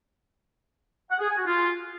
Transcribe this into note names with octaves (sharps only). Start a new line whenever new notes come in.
F#5
G#4
G#5
F#4
F4